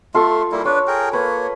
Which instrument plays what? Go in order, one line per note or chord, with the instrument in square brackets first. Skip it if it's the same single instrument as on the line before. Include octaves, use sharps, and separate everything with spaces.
[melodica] A3 C6 [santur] F4 A4 C#6
[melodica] G3 A#3 E4
[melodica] D4 B4 [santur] C#5
[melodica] G#4 A#4 G5
[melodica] A#3 C#5 [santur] B4